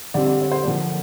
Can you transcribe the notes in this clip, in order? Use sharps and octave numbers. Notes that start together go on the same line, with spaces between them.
D3 G3 C4 D5
D5
C#5
C5
D3 F3 A#3 D5